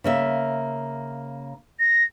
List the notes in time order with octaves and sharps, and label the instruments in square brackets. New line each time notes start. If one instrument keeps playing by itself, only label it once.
[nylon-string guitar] C#3 A#3 E5
[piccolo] A#6